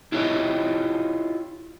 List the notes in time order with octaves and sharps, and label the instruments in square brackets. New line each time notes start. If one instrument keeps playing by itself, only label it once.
[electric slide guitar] E4 F4 G4 C#5 D#5